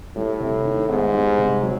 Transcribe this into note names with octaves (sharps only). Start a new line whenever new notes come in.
A2 G3
C3
D#3
G#2 B3
G3
C3
F#3